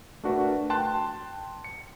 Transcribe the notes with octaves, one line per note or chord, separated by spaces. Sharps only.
A3 D4 F#4 A#4 B4
G5 A5 C6 F#6
C#7